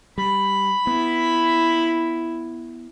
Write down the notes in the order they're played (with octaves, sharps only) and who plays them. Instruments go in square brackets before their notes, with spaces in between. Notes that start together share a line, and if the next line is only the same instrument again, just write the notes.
[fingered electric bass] G3 [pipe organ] B5
[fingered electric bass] B3 [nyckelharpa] E4